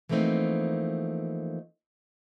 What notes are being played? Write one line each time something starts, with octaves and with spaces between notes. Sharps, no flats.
E3 F3 A3 A#3 C4 D#4